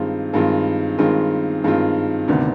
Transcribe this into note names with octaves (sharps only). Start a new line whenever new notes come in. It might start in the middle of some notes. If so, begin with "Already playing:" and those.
Already playing: G2 D#3 G#3 C4 F4
G2 D#3 G#3 C4 F4
G2 D#3 G#3 C4 F4
G2 D#3 G#3 C4 F4
D2 C3 D#3 B3 D4